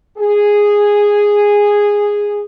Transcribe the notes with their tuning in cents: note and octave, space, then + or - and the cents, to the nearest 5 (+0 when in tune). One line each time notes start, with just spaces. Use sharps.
G#4 -10